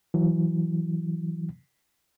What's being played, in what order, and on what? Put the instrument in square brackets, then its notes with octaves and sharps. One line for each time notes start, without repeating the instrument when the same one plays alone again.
[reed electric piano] E3 F#3